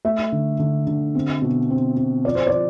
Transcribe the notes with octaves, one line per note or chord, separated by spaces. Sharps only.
A3 E5
D3
D3
D3
C4
B2
C4
C4
F3 D5
C5
D5
F3